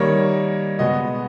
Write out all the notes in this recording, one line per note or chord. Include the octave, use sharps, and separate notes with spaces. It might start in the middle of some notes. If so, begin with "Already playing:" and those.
Already playing: D#3 G3 A#3 C#5
B2 G#3 B3 D#5